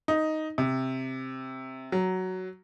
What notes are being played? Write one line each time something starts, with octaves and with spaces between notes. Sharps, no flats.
D#4
C3
F#3